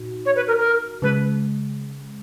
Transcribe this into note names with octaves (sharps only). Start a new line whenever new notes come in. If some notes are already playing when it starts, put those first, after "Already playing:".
Already playing: A#2 D#4 F#4
C#5
B4
A#4
A#4
C#3 G#3 B4